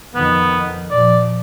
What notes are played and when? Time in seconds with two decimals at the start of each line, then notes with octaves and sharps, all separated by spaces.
0.15 F2 D#3 B3
0.91 A#2 F3 D5